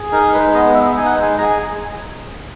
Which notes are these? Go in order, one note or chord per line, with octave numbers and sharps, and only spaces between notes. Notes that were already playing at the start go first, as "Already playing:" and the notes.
Already playing: G#4
D#4 A#4
G#3 B4
B3 D#5
G#3 E5
D#4 G#5
F#5
G#3
G#5
G#4 A#5
G#5